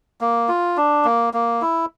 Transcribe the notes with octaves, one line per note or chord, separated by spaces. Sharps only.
A#3
F4
D4
A#3
A#3
E4